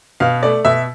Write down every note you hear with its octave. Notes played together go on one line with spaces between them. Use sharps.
B2 F5
A3 D5
B2 E5